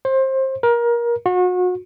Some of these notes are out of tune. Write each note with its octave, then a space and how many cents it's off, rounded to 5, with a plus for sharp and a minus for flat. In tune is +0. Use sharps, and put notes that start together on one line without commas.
C5 +25
A#4 +25
F#4 -35